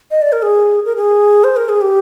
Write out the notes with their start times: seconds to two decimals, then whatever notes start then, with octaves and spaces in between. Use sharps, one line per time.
0.11 D#5
0.22 D5
0.32 A#4
0.42 G#4
0.85 A#4
0.96 G#4
1.44 C5
1.56 A#4
1.69 G#4
1.81 G4